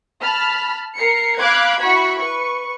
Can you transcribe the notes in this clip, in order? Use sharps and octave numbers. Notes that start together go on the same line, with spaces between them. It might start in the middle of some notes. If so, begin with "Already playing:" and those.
A5 B5 F6
A#4 C7 C#7
F5 B5 D6 F#6 G#6
E4 F#4 B5 C#6
B4 C#6